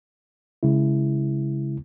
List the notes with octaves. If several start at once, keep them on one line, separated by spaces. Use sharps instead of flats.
C#3 G#3 E4